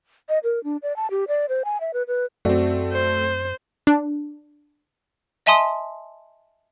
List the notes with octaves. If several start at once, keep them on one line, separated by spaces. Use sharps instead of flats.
D#5
A#4
D4
D5
A5
G4
D5
C5
G#5
E5
B4
B4
F#2 A3 C4 F#4 D5
C5
D4
D#5 E5 G#5 A5 C6 D#6